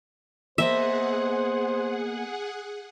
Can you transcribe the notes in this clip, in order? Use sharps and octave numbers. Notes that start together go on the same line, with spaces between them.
A#3 B3 G#4 C5 D#5 E5 F#5